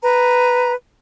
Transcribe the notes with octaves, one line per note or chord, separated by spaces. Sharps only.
B4 A#5